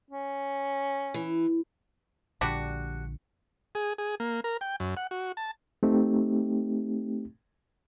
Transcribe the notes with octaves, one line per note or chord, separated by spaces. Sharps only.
C#4
E3
A#1 A#2 D3 G3 D4 F#4
G#4
G#4
A#3
A#4
G5
F#2
F#5
F#4
A5
A3 C4 D#4 G4